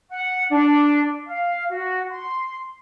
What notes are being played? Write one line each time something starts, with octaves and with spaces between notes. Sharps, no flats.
F#5
D4
F5
F#4
C6